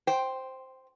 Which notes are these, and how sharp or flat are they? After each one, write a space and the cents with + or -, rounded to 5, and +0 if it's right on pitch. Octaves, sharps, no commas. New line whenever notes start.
C5 +0 G5 +0